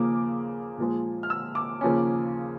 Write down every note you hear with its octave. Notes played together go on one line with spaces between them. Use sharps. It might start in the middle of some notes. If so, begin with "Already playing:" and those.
Already playing: D#2 C#3 F3 A#3 D6
A#2 F3 G#3
F6
E6
D6
D#2 C#3 F3 A#3 C#4